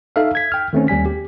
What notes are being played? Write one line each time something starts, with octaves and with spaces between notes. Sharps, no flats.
D#4 A4 E5 F5
G#6 B6
G5 F6
D#3 A3 C4 C#4
D#2 G3 G#5 B6
G4